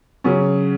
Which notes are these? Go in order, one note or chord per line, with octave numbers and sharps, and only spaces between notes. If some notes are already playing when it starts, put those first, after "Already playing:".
C#3 F#3 C#4